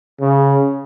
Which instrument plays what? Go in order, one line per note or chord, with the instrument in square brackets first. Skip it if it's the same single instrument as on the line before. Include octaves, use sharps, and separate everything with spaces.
[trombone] C#3